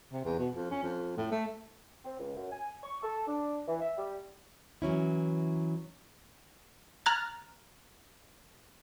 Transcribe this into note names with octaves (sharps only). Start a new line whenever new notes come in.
C3
E2
B2
F2
C#4
F2
A2
A3
C4
C#2
F#2
G#5
C#6
A4
D4
E3
E5
G3
E3 F#3 C#4 E4
A#5 F6 F#6 G#6 A6